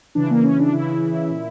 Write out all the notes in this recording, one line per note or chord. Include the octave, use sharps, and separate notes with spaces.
C#3 E3 D4
A#3
C#4
D4
C#3 E3 E4
A#2